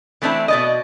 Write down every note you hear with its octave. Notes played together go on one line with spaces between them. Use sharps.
E3 A3 C4 D4 E4
B2 D5 D#5